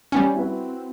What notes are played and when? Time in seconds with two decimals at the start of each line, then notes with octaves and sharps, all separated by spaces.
0.12 G3 B3 C#4 G#5
0.34 C4 E4 F#4 B4